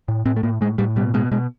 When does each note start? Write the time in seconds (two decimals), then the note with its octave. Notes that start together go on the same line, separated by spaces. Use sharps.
0.08 A2
0.26 A2 C4
0.36 A3
0.43 A2 A#3
0.61 A2 G#3
0.78 A2 G3
0.96 B2 G3
1.14 B2 G#3
1.32 B2 G#3